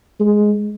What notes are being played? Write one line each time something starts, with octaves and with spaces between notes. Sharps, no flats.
G#3